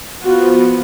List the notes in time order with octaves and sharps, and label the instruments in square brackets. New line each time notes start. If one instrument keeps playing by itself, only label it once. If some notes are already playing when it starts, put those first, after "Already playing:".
[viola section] F3 B3 F4 F#4